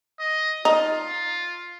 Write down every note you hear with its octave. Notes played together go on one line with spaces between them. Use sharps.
D#5
D#4 F4